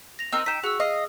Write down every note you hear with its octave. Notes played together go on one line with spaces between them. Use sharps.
A#6 F7
C4 D#4 A#4 E6
D#4 G5 B6 E7
F#4 G#4 E6
D#5 F5